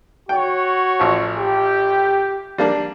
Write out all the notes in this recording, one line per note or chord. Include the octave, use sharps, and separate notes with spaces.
F#4 C#5 G5
A1 F3
G4
G3 A#3 D4